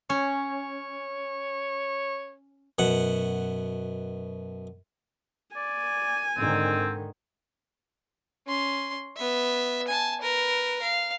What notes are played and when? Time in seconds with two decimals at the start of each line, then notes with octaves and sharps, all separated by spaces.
0.10 C#4 C#5
2.79 F#2 B2 F#5
5.56 D5 G#5
6.37 G#2 D3 D#3 C4
8.47 C#4 C6
9.17 B3 E5
9.88 G#5 A5
10.21 A#4 B4
10.82 F5